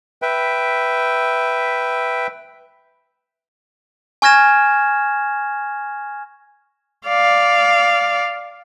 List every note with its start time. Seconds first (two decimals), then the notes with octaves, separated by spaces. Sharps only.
0.22 B4 E5 G5
4.22 G#5 C#6 F6 G#6 A#6 E7
7.07 D5 F5